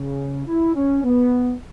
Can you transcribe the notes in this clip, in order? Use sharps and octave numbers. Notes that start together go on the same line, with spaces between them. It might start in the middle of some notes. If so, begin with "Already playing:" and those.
Already playing: C#3
E4
C#4
B3